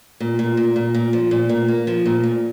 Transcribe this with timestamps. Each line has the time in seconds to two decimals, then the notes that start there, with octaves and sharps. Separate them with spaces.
0.20 A#2
0.39 A#2
0.57 A#2
0.76 A#2
0.95 A#2
1.13 F3
1.31 A#2
1.49 A#2
1.68 A#3
1.87 F3
2.06 A#2
2.24 A#2